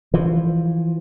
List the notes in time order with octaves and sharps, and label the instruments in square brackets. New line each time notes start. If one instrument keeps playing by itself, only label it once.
[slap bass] E3 F3